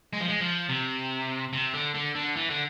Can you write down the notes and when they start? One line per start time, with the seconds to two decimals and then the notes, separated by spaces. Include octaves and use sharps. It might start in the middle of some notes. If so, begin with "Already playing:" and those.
0.13 G#3
0.20 F3
0.28 G#3
0.41 F3
0.69 C3
1.53 C3
1.73 D3
1.94 D3
2.15 D3
2.36 E3
2.50 D3